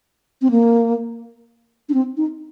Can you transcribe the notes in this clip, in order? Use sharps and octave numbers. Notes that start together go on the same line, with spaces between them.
C4
A#3
D4
C4
D#4